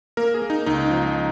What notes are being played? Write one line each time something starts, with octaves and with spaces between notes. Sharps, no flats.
A#3 A#4
G#4
A#3
D#4
C#2 D#4
F3